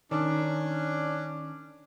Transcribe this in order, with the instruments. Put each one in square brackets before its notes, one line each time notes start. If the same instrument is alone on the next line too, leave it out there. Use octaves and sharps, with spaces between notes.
[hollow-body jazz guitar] D#3 [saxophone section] C#4 D4